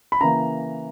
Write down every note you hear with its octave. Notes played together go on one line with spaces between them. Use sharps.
B5
C#3 E3 A#3 A#5